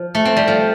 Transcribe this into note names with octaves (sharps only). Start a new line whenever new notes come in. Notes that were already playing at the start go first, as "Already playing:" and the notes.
Already playing: F3
A3
C4
G3
F3